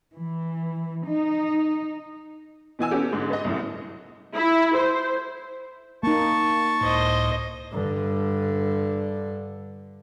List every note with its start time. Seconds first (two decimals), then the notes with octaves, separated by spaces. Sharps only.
0.15 E3
1.08 D#4
2.79 B2 E3 G#5 E6
2.91 B3 C#4 F#4 G4 A4
3.13 G#2 D3
3.30 B4 D#5
3.44 C2 F#2 A2
4.35 E4
4.76 C5
6.03 A#3 D#4 A5 C#6
6.81 C#2 A2 C5 D#5
7.72 G2 D3